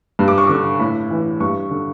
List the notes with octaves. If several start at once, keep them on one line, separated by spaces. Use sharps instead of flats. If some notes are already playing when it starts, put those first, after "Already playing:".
G2
D6
C#6
D3 D6
A2 B5
E3
G2 C#6
D3